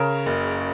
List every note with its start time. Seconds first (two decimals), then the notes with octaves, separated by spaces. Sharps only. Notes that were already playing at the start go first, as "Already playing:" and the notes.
Already playing: C#3 A#4 C#5
0.26 F#1